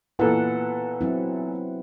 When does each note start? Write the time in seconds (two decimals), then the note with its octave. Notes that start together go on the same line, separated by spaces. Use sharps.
0.19 A#2 E3 B3 A4 B4 F#5
1.01 F#3 C4 E4